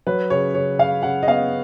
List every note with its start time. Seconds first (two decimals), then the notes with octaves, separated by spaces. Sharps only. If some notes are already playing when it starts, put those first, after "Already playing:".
0.07 F#3 B4
0.30 C#3 C#5
0.54 C#3 C#5
0.78 C#3 F5
1.03 C#3 F#5
1.23 D#5
1.27 B3 F5